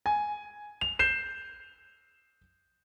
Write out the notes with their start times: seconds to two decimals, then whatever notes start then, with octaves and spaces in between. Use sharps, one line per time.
0.06 G#5
0.81 F7
0.99 G6 C7 E7